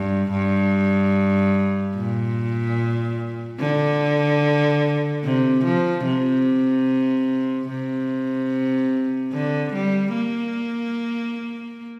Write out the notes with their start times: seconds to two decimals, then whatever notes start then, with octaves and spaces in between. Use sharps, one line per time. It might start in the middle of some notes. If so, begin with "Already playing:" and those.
Already playing: G2
0.32 G2
1.96 A#2
3.59 D3
5.24 C3
5.64 F3
6.05 C3
7.69 C3
9.32 D3
9.73 G3
10.14 A#3